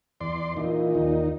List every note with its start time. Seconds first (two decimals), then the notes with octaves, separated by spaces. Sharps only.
0.21 E2 D5 C6
0.57 A#2 E3 D#4
0.95 D#2 D#4